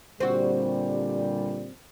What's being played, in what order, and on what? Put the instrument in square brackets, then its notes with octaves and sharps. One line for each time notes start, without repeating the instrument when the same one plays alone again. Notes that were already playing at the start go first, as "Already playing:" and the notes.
[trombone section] A#2 D3 G3 [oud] C4 F#4